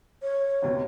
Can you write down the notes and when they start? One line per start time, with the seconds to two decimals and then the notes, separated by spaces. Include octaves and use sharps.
0.22 C#5
0.62 G#1 D#2 B2